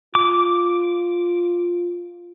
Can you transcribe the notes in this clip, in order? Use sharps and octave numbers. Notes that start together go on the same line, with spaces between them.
F4 D6